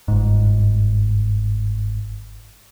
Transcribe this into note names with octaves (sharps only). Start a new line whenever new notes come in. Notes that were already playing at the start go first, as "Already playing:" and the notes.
G1 G#2